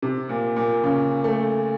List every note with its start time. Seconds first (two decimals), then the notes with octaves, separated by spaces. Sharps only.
0.02 C3
0.29 A#2
0.56 A#2
0.84 C#3
1.24 A3